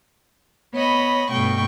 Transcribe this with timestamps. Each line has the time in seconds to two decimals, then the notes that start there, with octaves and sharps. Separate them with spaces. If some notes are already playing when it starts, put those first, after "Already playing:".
0.73 B3 C#5 D#5 B5
1.30 G2 B2 A3 G5 C#6